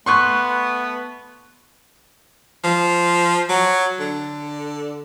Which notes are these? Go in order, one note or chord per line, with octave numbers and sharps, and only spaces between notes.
A3 B3 C6 C#6 F#6
F3
F#3
D3